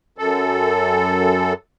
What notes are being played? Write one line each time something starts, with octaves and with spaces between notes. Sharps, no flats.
F#2 A4